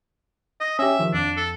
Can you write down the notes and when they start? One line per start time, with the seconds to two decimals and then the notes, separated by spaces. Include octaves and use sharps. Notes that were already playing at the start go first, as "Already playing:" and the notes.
0.61 D#5
0.79 C#4 G4 E5
0.99 D#3 F3
1.13 F2 D4
1.37 A4